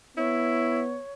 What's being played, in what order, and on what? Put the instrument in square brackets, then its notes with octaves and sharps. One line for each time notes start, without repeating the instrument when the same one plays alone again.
[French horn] B3 [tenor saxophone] E4 [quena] C#5